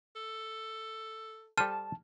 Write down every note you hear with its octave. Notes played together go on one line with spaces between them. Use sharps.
A4
G3 A4 C5 A5 F6 D#7